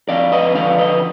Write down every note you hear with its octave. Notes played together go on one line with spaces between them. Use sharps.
F2 D5 F5
B4 D#5
D3 F3 D5 F5
B4 D#5